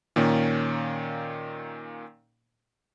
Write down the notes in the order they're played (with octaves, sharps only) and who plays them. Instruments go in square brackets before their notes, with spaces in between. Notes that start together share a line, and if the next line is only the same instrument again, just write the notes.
[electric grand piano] A#2 D#3 A#3 C#4